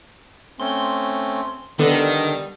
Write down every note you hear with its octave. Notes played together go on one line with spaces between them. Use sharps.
A3 C4 C#4 C6
D3 D#3 G3 B3 D4 A4